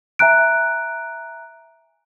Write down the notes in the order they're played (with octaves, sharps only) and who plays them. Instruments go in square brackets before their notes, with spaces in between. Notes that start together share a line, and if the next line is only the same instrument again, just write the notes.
[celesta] E5 G#5 A#5 F#6 D7